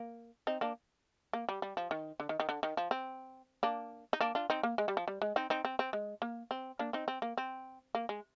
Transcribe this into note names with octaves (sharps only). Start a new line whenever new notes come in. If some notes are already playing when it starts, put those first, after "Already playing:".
Already playing: A#3
C4 D#4
A#3 D4
A#3
G3
G3
F3
D#3
D3
D#3
D#3
D3
D#3
F3
C4
A#3 D4
D#4
A#3 D4
D4 F4
C4 D#4
A#3
G#3
G3
F3
G3
G#3
C4 D#4
C4 D#4
C4
C4
G#3
A#3
C4
A#3 D4
C4 D#4
C4
A#3
C4
A#3
G#3